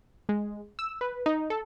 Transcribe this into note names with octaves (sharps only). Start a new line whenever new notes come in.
G#3
E6
B4
D#4
A4